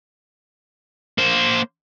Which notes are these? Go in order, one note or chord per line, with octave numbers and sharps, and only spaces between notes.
A#3 C5